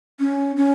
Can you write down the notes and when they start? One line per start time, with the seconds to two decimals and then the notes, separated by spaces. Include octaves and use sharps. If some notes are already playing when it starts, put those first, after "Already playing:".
0.20 C#4
0.56 C#4